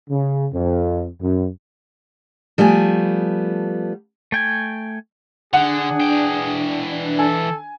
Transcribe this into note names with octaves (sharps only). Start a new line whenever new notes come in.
C#3
F2
F#2
F3 G3 A3 B3 G#5
A3 G5 G#5
D3 D4 G#4 F#5
E3 G5
A4 G#5